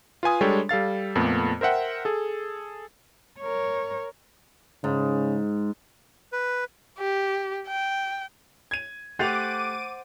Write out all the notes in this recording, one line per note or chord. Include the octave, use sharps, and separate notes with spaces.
F4 B4 G#5 D#6
G3 G#3 D4 A4 C#5 G5
G3 A4 F5 A6
F2 A#2 A3 B3
A#4 C5 E5 F#5 G5
G#4 A4
A#4 C#5
G#2 C#3
B4
G4
G5
G#6 D#7
A3 G4 C5 F#5 D6 A6 D#7 F7